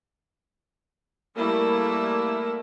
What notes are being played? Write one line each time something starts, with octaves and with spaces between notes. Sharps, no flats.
G3 A3 A#3 E4